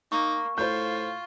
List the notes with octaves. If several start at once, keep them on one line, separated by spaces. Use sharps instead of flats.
A#3 D#4 C#6
A2 F4 C5 G6